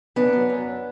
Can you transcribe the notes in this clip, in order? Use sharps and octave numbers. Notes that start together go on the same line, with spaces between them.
F#2 B3 D4
F#3
F#2